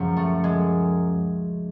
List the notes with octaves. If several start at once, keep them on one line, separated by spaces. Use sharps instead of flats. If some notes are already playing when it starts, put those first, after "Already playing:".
Already playing: C#2 F#2 F3
A3
G#3